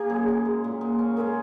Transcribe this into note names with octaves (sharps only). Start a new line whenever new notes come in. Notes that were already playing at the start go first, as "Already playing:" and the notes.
Already playing: A#3 G#4
F#2
F#2
G#3
A#2
G#3
C#4
G#3 G#4 A#4